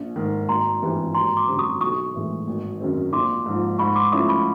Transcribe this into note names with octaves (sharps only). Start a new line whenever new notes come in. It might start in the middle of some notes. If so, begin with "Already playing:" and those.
Already playing: A#1
G#2 D#3
G#1 A#5 C6
G2 E3 G3 C4
G#1 A#5 C6
C6 D6
F#2 D3 G3 C4
C#6 D#6
B1 C#6 D#6
A2 E3 G#3
G#1
F#2 D#3 G#3 C4
A#1 C6 D6
G#2 F3
G#2 B5 C#6
C6 D6
F3 A3 C#4 E4 C#6 D#6
B5 C#6